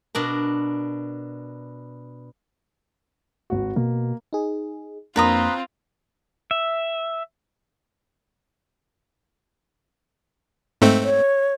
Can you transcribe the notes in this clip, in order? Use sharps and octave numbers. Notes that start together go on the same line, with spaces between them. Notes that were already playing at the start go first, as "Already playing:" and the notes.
B2 D4 A#4
G#1 F#4
B2 A#3
D#4 G#4
F2 A#3 C4 D4 F4 B4 A#5 D#6
E5
G#2 A3 C4
C#5